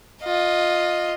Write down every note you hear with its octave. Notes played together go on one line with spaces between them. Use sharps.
F4 D#5